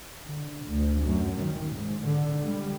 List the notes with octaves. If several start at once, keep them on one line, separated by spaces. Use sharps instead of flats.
D3
D2
F#2
D#3
G#2
D3
G3